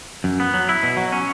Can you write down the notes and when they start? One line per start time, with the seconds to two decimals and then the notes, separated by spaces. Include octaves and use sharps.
0.24 F#2
0.40 B3
0.54 F#3
0.69 E4
0.83 B2
0.97 F#3
1.12 C#4